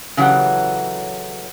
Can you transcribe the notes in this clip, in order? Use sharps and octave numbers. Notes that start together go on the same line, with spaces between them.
C#3 E3 F#3 G4 A4 F#5